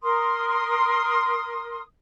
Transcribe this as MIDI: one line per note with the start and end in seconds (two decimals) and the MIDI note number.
0.02 1.80 70
0.02 1.80 84
0.02 1.80 87